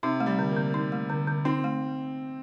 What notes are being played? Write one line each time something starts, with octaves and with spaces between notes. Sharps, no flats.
C3 D#4
A3
G3
D3
A#3
D3
D#4
A3
D3
D3
C4 D#4
A3